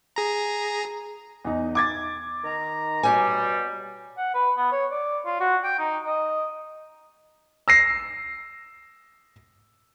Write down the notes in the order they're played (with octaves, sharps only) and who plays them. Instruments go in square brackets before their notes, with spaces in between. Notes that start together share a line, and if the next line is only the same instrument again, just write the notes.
[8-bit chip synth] G#4 A#5
[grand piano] E2 D#4
D6 G#6 A6
[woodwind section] D#3 A#5
[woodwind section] B2 G3 [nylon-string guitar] C#5 G#5
[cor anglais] F#5
B4
B3
C#5
D5
F4
F#4
G5
D#4
D#5
[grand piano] E6 A#6 C7